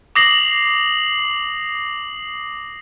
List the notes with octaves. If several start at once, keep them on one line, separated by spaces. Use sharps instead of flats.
D6 D#6 A#6 C7 F#7